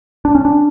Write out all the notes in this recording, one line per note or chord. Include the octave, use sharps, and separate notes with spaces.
D4
C#4
D4